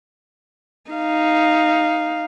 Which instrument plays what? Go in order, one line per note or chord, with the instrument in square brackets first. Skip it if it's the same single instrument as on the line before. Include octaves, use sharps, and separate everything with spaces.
[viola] D#4 F5